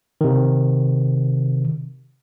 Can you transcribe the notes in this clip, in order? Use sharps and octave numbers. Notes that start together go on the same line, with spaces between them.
C3 D#3